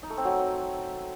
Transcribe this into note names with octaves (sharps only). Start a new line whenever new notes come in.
D#4
A3
C4
F#3